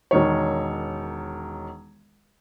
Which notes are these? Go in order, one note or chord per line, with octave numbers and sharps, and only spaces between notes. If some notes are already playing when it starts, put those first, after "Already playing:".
E1 D#3 C#5